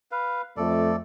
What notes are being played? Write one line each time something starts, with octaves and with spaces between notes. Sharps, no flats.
B4 F5
F2 A3 A4 D5